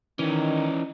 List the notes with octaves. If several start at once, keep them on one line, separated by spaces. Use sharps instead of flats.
D#3 E3 C#4 D#4